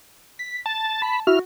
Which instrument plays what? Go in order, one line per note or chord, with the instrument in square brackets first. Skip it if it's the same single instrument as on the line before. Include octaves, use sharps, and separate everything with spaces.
[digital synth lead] B6
[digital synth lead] A5 [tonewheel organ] A6
[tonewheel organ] B5
[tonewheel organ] E4 F6 [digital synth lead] F#4